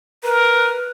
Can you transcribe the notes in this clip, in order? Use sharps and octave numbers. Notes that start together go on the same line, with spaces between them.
A#4 B4